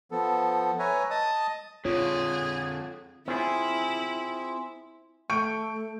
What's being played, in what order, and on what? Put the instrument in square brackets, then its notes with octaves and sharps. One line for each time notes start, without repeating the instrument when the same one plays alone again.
[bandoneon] F3 B3 A4
B4 C#5 E5 G#5 A#5
D#5 A5 D#6
[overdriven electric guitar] F2 D3 [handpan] F4 C#5 [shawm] G#4
[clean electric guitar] C4 F4 G#4 [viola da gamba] E4
[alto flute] A3 [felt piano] C#6 G6 D7